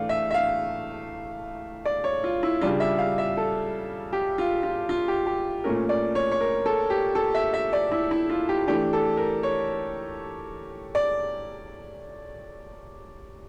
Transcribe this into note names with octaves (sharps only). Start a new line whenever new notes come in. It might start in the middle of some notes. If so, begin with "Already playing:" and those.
Already playing: A2 E3 A3 D4 F5
E5
E5
F5
D5
C#5
F4
E4
C#3 G3 D4 F4
E5
F5
E5
A4
G4
F4
F4
F4
G4
G4
A#2 A3 C#4 A#4
D5
C#5
C#5
A#4
A4
G4
A4
E5
E5
D5
E4
E4
F4
G4
E3 A3 D4 G4
A4
A#4
C#5
D5